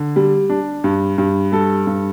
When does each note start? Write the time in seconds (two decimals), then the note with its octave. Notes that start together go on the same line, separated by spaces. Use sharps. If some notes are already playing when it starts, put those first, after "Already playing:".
Already playing: D3
0.16 G3
0.50 D4
0.84 G2
1.18 G2
1.52 G3 A4
1.87 G2